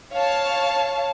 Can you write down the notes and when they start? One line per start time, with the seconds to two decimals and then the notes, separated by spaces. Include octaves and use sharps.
0.13 C#5 F5 A5